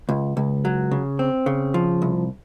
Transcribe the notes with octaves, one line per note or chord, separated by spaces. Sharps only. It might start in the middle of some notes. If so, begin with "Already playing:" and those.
C#2
C#2
F#3
C#3
C4
C#3
F3
C2